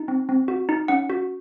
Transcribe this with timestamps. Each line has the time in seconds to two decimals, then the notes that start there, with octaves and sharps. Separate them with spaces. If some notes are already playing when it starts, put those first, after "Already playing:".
Already playing: D#4
0.08 C4
0.29 C4
0.48 F#4
0.69 D#4
0.88 C#4 F#5
1.10 F#4